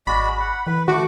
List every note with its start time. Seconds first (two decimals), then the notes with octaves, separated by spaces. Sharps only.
0.07 G#1 G#3 F#4 D5 B5
0.40 F#5
0.67 E3 B4
0.88 D#3 A3 F#4 C#6 D6